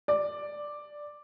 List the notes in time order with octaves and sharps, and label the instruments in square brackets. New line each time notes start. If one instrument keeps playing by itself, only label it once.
[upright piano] D5